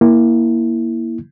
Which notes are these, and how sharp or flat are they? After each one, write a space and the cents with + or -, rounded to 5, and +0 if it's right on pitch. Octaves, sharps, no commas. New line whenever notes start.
A#3 +15 E4 -5